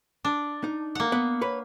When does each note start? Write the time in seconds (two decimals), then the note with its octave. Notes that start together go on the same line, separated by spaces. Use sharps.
0.25 D4
0.64 D#4
0.95 A#3 F#5
1.12 B3
1.41 B4 C#5